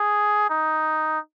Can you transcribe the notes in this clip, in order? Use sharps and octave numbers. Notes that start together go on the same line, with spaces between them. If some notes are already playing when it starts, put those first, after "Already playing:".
Already playing: G#4
D#4